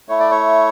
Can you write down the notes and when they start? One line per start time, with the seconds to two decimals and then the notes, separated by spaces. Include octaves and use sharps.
0.09 A3 E4 C#5
0.20 D5
0.31 C#5